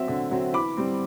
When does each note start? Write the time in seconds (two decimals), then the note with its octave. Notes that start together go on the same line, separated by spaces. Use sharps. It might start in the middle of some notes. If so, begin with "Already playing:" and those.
Already playing: F#3 C4 E5
0.08 D3
0.31 F#3 C4
0.53 E3 B5 D6
0.77 G3 C4